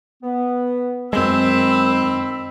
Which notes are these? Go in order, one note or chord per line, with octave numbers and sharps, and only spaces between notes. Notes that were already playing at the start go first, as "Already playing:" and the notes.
B3
F#2 D#3 G#3 C4 B5 E6